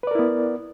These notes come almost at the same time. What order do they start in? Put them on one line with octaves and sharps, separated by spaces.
B4 D5 A#4 E4 B3